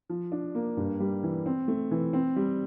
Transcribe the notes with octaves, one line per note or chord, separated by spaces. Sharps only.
F3
D4
A#3
G2
G3
E3
C4
A3
E3
C4
G3